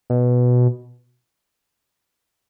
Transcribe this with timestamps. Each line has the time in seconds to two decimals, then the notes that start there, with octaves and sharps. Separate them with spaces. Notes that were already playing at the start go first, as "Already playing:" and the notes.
0.10 B2